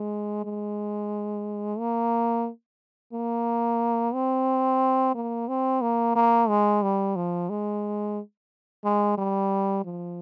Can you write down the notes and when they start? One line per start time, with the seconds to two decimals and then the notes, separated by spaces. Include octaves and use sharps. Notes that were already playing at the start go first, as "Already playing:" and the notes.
Already playing: G#3
0.45 G#3
1.79 A#3
3.13 A#3
4.14 C4
5.15 A#3
5.48 C4
5.82 A#3
6.16 A#3
6.49 G#3
6.83 G3
7.16 F3
7.50 G#3
8.85 G#3
9.18 G3
9.85 F3